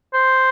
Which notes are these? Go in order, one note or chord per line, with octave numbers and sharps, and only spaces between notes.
C5